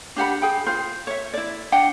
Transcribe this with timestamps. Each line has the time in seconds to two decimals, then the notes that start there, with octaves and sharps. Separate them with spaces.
0.16 D4 G4 F#5 B5
0.42 G#4 G5
0.66 F4 C5
1.07 C#5 E5
1.34 E4 D5
1.72 D4 F#5 G5